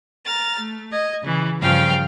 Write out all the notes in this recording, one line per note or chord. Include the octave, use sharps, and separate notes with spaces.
A#5 F6 A6
A3
D#5 G#6
C#3 E3
G2 C#3 F3 F5 G5 F6